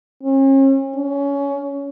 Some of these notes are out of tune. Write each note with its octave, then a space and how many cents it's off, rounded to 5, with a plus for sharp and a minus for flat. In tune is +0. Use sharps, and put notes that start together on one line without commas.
C#4 -40
C#4 +20